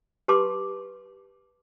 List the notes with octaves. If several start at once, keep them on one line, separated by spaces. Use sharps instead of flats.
G4 B4 A5 C6 D6